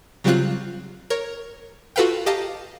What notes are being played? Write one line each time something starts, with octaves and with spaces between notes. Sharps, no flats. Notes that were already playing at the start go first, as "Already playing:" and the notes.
C#3 F#3 G3 C4 F4 F#6
A#4 C#5
F4 F#4 A4 B4 F5 G5
G4 D#5 F5 A5 A#5